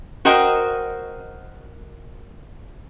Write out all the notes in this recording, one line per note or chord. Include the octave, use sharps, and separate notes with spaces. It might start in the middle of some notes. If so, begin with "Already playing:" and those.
F#4 A#4 C5 D#5 G5